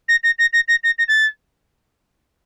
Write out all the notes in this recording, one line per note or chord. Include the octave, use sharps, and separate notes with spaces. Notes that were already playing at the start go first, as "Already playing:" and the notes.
A#6
A#6
A#6
A#6
A#6
A#6
A#6
A6